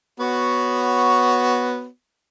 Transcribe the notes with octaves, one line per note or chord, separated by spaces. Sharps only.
B3 F#4 C#5